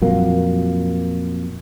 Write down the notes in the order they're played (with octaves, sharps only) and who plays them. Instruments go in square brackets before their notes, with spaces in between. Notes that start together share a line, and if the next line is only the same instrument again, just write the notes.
[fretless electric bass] F2 A#2 F#3 A#3